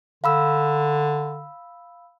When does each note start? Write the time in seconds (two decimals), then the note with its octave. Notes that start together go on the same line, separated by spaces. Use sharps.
0.24 D3 F5 B5 E6